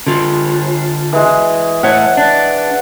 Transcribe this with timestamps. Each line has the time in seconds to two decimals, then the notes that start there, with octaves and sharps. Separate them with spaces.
0.07 D3 F4
1.13 E3 G#3
1.83 A2 C#5 F#5
2.17 D4